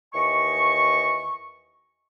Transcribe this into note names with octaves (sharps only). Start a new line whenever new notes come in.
D#2 E3 D#5 G#5 C#6